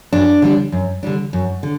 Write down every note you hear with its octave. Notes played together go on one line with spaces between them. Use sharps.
F#2 D4
D3 G3 D4
F#2
D3 G3 D4
F#2
D3